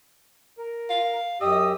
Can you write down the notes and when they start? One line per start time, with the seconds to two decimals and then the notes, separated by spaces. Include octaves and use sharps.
0.58 A#4
0.90 F5
1.41 F#2 G4 D#5 D#6 E6